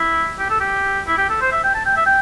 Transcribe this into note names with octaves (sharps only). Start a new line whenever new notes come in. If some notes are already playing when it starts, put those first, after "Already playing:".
Already playing: E4
G4
A4
G4
E4
G4
A4
C5
E5
G5
A5
G5
E5
G5